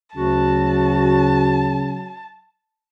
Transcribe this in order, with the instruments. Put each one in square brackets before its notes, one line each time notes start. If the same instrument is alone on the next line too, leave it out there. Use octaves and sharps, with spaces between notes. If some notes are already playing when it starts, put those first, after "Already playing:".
[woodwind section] D2 F#4 [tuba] C#3 [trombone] F#3 [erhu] A5